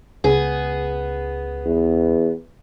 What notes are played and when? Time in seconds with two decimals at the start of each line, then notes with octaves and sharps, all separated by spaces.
0.24 C#2 B3 G#4
1.66 E2